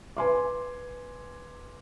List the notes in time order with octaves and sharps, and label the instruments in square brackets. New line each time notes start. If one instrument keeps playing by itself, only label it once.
[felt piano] B4 G#5 C6 D6